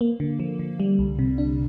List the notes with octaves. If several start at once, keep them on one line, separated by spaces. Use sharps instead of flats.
A#3
D3
F3
D3
G3
C2
C3
D4